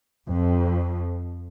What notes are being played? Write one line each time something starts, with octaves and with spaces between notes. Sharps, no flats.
F2